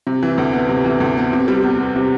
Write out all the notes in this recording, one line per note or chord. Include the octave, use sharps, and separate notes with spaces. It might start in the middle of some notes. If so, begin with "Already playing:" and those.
C3
E3
D2
B3
C3
E3
D2
B3
C3
G3
E2
B3
C3